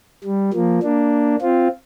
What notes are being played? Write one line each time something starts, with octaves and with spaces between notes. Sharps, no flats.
G3
F3 A#3
A#3 D4
C4 F4